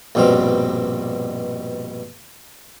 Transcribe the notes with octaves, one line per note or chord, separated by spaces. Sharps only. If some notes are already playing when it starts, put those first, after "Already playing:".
A#1 G2 B2 C4 F5